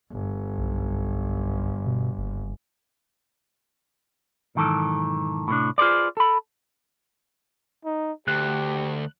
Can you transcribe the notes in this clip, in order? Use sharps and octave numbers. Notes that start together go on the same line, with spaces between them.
G1
B1
B2
F#1
B1 G#2 D#3 E3 A4
A2 C3 A#3 D4
F4 G#4 B4 C5 D5
A4 B5
D#4
D2 G4 F#6